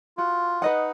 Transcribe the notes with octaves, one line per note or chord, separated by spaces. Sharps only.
F4 F#4
D#4 B4 D#5 F#5